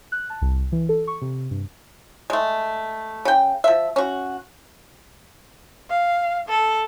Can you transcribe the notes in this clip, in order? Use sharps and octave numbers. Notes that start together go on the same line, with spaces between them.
F#6
A5
C2
E3
A4
C#6
C3
G2
G#3 A3
C#3 G5
F3 E5
C#4 F#4
F5
A4